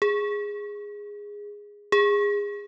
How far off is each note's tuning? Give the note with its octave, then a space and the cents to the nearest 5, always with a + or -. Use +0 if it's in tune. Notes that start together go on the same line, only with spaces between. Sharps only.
G#4 -10
G#4 -25